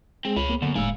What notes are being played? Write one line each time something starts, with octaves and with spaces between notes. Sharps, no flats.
G#3 C4 G#4
C#2 C#5 B5
A#3 B3
F#2 D3
F1 A2 G#3 F5 G#5 E6